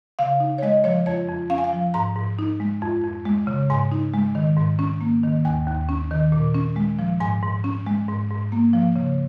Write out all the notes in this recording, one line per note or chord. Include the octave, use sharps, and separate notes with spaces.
C#3 F5
D#4
C#5
G#3 D#5
F3 C#5
F2 C#5
F2
C#4 F5
G#5
F5
F3
G#2 A#5
G#2
D#4
G#3
F2
F2
G#3
C#3
G#2 G#5
D#4
G#3
D#3
G#2
C#4
A#3
D#3
D#2 G#5
D#2
C#4
D#3
A#2
C#4
G#3
F3
G#2 G#5
G#2
C#4
G#3
G#2
G#2
A#3
F3
C#3